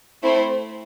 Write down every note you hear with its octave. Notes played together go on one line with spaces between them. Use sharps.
A3 C4 E4 C5